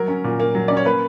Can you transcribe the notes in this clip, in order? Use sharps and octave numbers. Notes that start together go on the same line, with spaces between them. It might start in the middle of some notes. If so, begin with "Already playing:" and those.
Already playing: F#3 A#4
C#4
A#2
A#3
F#3
C#4 D5
C#5
A#3 B4